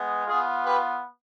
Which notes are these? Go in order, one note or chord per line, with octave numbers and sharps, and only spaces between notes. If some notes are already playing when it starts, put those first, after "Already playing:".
Already playing: G#3 B3
B3 F4 G#4
G4 B4